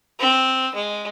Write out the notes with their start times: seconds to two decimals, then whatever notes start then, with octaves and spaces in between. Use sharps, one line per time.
0.19 C4
0.74 G#3